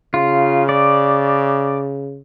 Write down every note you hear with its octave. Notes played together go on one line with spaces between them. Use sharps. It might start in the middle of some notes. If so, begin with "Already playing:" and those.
C#3 F4
D5